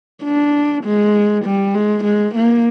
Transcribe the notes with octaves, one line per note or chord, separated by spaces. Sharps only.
D4
G#3
G3
G#3
G#3
A#3